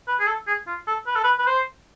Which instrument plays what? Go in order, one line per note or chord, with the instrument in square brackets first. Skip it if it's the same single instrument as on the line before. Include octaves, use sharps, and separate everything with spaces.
[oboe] B4
G#4
A4
G#4
F4
A4
B4
A4
B4
B4
C5